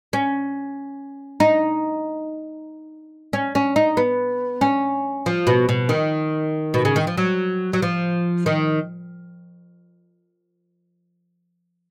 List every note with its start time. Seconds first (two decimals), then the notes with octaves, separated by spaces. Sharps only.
0.13 C#4
1.40 D#4
3.33 C#4
3.55 C#4
3.76 D#4
3.97 B3
4.61 C#4
5.26 F3
5.47 B2
5.69 B2
5.89 D#3
6.74 B2
6.85 C#3
6.96 D#3
7.07 F3
7.17 F#3
7.73 F#3
7.82 F3
8.46 D#3